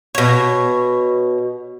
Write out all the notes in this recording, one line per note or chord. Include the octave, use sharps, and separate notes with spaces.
B2 C#5